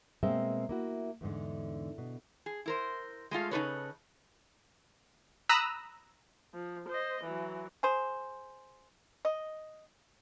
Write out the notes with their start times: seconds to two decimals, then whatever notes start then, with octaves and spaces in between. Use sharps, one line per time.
0.23 B2 G#3 A#3 C4 E5 G5
0.69 A#3 E4 F#4
1.21 E2 G#2 D3
1.98 B2
2.46 G#4
2.66 E4 A#4 C5
3.31 G#3 A3 F4 F5
3.51 C#3 D#4 G#4 A4 B4 C#5
5.49 A#5 B5 D#6 E6 F#6 A#6
6.54 F3
6.89 C5 D#5
7.24 E3 F#3
7.83 G#4 C5
9.25 D#5